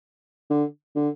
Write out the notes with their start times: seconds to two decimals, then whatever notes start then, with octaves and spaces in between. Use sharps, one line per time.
0.51 D3
0.96 D3